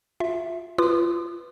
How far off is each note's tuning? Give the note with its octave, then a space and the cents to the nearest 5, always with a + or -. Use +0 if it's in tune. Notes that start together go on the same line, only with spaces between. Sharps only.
F4 +10 E5 +0
F4 -25 B4 +0 D#6 -45